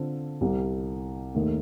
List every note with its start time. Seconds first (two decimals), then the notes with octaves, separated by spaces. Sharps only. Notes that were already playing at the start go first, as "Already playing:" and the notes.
Already playing: D3 C4 F4 A4
0.41 C2 C3 G3
1.35 D#2 D#3 A3 D#4